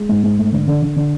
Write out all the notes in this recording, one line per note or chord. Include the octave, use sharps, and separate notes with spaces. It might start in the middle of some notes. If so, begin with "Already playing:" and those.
Already playing: G#3
G#2
G#2
A3
D3
D3
D3
D3